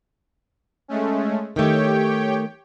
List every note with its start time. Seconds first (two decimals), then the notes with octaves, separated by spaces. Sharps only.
0.88 G#3 A3 C#4
1.56 D#3 A3 G4 C#5 G5